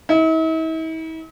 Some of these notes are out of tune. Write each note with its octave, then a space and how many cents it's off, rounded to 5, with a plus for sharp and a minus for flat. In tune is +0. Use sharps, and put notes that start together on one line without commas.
E4 -45